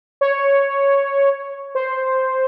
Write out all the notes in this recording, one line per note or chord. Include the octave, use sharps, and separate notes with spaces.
C#5
C5